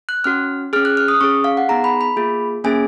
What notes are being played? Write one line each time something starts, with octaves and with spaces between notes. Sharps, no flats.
F#6
C#4 F#4 F6
C#4 G#4 F6
F#6
F6
D#6
C#4 G#4 C#6
F5
F#5
B3 D#4 G#4 A#5
B5
B5
A#3 F4 G#4
A#3 C#4 G#4 G#5